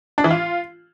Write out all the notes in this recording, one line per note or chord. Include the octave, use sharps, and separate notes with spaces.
D4
E3
F4